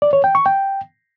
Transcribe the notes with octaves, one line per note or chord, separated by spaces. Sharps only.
D5
C#5
G5
C#6
G5